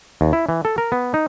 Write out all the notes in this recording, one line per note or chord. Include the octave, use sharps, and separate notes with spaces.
D#2
E4
E3
A4
A#4
B3
D#4